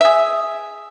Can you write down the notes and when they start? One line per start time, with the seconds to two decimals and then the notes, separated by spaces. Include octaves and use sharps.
0.01 G#4 E5